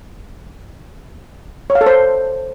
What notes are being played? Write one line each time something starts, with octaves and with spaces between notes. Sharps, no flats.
C#5
F5
A4
C5